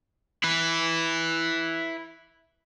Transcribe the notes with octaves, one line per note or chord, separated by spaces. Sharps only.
E4 B4